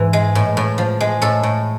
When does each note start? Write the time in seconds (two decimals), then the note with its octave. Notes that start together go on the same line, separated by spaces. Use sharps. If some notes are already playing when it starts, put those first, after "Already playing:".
Already playing: G#2 E3 B4
0.13 G#3
0.35 A2
0.57 A2
0.78 F3
1.00 G#3
1.22 A2 A4
1.43 A2